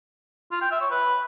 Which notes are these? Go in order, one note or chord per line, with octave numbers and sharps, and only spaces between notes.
F4
G5
E5
C#5
B4